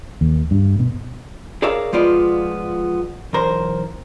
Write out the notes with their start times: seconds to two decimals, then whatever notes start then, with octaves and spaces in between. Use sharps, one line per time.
0.21 D#2
0.51 G2
0.79 B2
1.62 G#4 A#4 C#5 D5 E5 F5
1.93 F3 G#3 B3 F4 D5
3.33 B1 E2 A#4 C5